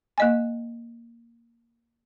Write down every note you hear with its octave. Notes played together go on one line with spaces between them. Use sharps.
A#3 D#5 G#5